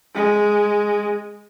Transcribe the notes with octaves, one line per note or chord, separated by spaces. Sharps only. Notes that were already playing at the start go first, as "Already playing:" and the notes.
G#3